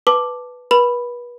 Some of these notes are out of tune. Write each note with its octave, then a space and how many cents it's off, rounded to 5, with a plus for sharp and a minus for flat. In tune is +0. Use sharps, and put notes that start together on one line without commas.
B4 +0 A5 +0 D6 +0
B4 -35 B5 +0